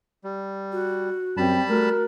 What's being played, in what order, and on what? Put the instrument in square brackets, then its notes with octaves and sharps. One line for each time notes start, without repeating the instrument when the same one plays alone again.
[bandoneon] G3
[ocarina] F#4
[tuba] F#2 [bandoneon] G3 A5 B5 [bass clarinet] C4
[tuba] A3 [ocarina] F#4 [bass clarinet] A#4